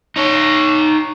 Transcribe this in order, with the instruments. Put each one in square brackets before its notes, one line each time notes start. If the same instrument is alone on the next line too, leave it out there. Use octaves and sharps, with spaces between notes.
[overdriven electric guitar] D#4 C#5